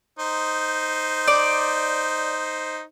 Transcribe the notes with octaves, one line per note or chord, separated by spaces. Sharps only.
D#4 C5
D5